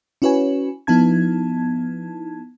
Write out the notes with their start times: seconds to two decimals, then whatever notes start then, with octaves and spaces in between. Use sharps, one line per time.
0.22 C#4 E4 F#4 B4 C#5 G#5
0.87 F3 B3 D#4 E4 A5 G#6